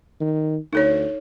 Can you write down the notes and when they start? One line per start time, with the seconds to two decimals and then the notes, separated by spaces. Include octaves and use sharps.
0.20 D#3
0.73 D2 D#4 A4 C#5